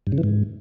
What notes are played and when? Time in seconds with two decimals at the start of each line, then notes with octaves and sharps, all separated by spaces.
0.07 G2
0.12 C#3
0.18 E3
0.23 G#2